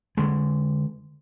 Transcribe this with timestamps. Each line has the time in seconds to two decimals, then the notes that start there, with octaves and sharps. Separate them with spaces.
0.17 D3 G#3